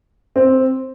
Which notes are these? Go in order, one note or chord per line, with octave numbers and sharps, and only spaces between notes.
C4